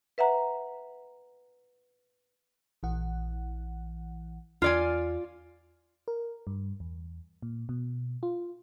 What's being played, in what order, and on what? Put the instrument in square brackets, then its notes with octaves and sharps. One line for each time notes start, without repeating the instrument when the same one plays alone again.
[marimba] B4 E5 F#5 A#5
[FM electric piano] A#1 E3 F#5
[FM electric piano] E2 [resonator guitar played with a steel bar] F4 D5 G#5
[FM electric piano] A#4
G2
E2
A#2
B2
F4